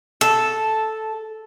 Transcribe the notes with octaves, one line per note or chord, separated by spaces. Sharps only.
A4